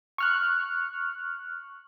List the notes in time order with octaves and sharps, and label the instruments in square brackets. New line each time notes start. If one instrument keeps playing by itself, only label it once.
[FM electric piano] C#6 F6 F#6